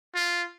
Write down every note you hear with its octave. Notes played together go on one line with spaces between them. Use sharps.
F4